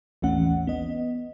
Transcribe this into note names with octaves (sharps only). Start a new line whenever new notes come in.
A1 D#2 E3 A3 C#4 F#5
B3 D#5